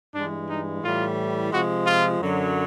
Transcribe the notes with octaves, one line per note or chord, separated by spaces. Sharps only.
G2 E3 G#3 D4
D#4
A2 E3 G3 F4
C3 F3 G#3 F#4
F4
F#2 D3 F#3